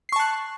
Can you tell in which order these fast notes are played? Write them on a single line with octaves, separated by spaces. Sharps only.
C7 C#6 A5 F#6